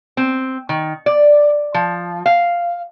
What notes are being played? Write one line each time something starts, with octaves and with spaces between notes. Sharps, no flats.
C4
D#3
D5
F3
F5